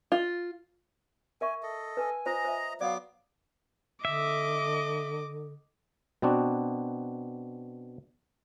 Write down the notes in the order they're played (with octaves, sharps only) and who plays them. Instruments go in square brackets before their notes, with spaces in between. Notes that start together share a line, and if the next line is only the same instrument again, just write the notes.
[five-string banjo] F4
[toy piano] A#4 E5 C#6 [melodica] G#5
[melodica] A4 D#5
[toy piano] B4 E6 [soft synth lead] G#5
[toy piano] F4 C5 [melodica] D#5 A#5
[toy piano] C5 E5
[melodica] F#3 B3 D6 [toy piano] D5 [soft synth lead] F5
[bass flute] D3 [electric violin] D#5 D6 [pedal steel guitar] E5
[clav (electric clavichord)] B2 B3 C4 D4 F#4